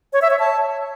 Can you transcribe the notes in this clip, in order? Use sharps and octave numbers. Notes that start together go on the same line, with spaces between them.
C#5
E5
C#5
A5